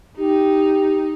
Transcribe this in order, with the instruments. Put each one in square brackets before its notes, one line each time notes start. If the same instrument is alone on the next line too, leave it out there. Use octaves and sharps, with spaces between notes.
[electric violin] D#4 [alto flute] G4